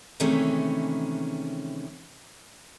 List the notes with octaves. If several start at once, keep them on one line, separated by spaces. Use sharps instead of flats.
C3 D#3 E3 G#3 A3 C#4